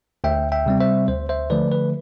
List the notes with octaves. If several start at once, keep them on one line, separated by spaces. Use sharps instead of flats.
D2 E5 G5
E5 G5
C3 G3 C4
C5 E5
D2 C5
C5 E5
D3 F3 A3 B4 D5
B4